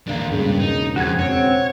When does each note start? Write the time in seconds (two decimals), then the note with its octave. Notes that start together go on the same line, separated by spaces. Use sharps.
0.08 D#2 D4 A#4 F5
0.31 E1 G2 C#3 A#3
0.60 D#4
0.96 F2 F#4 G#5
1.19 C4 F#4 C#5